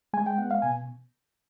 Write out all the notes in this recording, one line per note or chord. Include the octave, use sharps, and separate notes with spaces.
G#3 G#5
G5
B3 F#5
F5
B2 G#5